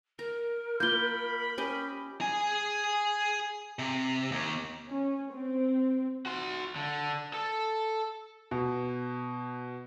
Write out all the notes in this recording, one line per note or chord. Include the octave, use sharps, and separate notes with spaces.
A#4 A#5
A#3 F4 B5 G6 G7
C#4 G4 D#5
G#4 G#5
C3
D#2
C#4
C4
F#4 C6
D3
A4
B2